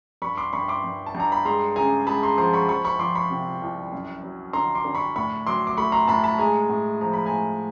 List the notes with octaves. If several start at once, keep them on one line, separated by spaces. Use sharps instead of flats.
G2 B5 C#6
C6 D6
G2 B5 C#6
C6 D6
G2
A5
G2
A#5
B5
G#3 A#5 C6
C#3 G#5 A#5
G#3 A5 B5
A#5 C6
F3 A#5 C6
B5 C#6
F3 B5 C#6
B5 C#6
F3 C6 D6
B5 C#6
C3
C2
F#2
F#3
D3 A#5 C6
C6 D6
D3
B5 C#6
A2 B5 C#6
F#3 C6 D6
D6
A3 B5 C#6
A#5 C6
A2 A5 B5
A5 B5
G#3 G#5 A#5
A2
F3 A#5
B5
G#5 A#5
A2